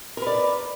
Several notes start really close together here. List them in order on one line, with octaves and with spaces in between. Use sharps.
A#4 B4 D5